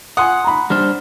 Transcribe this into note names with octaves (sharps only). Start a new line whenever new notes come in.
F#5 G#5 C6 D#6
A#5 B5
G3 D4 C5 F6